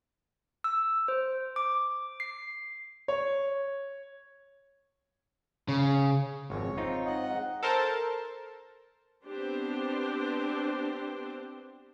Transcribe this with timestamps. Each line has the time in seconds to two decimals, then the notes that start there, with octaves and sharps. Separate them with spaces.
0.64 E6
1.08 C5
1.56 D6
2.20 C7
3.08 C#5
5.68 C#3
6.50 G#1 F2 C#5
6.77 C4 D#4 F4
7.06 G#2 D#5 F#5
7.63 A4 A#4 C5 A5
9.26 B3 C4 D4 G4 C5